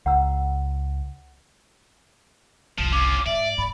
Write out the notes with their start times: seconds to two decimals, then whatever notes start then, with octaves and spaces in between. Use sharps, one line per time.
0.06 C#2 F#5 A#5 E6
2.78 F#1 C2 F3
2.92 C#4 F4 D6
3.26 G#2 D5 E5
3.58 G#2 B5